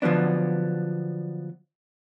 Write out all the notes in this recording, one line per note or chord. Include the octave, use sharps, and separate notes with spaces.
D3 F3 F#3 B3 D4